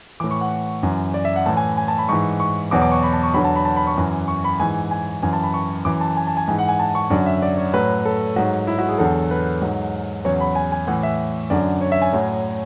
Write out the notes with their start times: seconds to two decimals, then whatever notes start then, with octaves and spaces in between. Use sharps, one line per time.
0.20 A2 E3 D6
0.31 C#6
0.41 F#5
0.83 F#2 E3
1.14 D5
1.25 E5
1.36 F#5
1.46 A2 E3 A5
1.57 G#5
1.77 G#5
1.88 A5
1.98 B5
2.09 G#2 E3 C#6
2.40 C#6
2.71 E2 B2 F#3 D6
2.82 D6
2.92 C#6
3.03 B5
3.13 A5
3.23 C#6
3.34 E2 D3 F#3 B5
3.45 A5
3.56 B5
3.65 A5
3.76 B5
3.87 C#6
3.97 F#2 E3
4.28 C#6
4.44 B5
4.60 G#2 E3 G#5
4.91 G#5
5.22 F#2 E3 G#5
5.33 A5
5.44 B5
5.54 C#6
5.85 F#2 E3 D6
6.01 A5
6.17 G#5
6.27 A5
6.37 G#5
6.48 G#2 E3 G#5
6.59 F#5
6.69 G#5
6.80 A5
6.95 C#6
7.10 F#2 D3 F#3 D5
7.26 E5
7.42 D5
7.57 C#5
7.74 A2 F#3 B4
8.05 A4
8.36 G#2 F#3 F#4
8.67 E4
8.78 F#4
8.89 G#4
8.98 E2 D3 F#3 A4
9.31 B4
9.61 G#2 F#3
10.25 E2 C#3 F#3 C#5
10.40 B5
10.55 G#5
10.72 G#5
10.87 A2 E3 F#5
11.03 E5
11.50 F#2 D3 F#3 D5
11.81 C#5
11.92 E5
12.02 G#5
12.13 A2 F#3